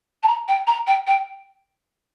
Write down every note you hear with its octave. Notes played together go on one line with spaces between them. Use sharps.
A5
A#5
G5
A#5
G5
G5